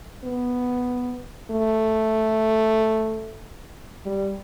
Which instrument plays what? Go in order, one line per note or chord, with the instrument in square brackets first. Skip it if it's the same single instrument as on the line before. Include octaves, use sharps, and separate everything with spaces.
[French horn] B3
A3
G3